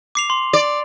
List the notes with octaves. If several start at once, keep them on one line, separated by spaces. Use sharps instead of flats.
D6 C7 F7
C6
D5